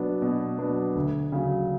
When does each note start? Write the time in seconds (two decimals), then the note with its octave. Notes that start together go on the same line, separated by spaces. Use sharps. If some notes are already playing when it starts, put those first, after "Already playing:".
Already playing: B2 F#3 B3 D4
0.22 B2
0.58 F#3 B3 D4
0.95 D2
1.32 C#3 F#3